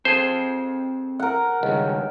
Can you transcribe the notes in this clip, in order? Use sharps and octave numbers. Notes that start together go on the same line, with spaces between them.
C4 G#4 A4 C5 A5
A#4 F#5
C#2 G2 D#3